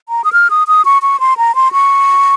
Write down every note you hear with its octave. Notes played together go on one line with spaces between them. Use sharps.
A#5
D#6
F6
D#6
D#6
C#6
C#6
C6
A#5
C6
C#6